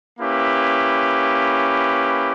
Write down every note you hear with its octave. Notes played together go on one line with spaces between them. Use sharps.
A#3 C#4 E4 G4 B4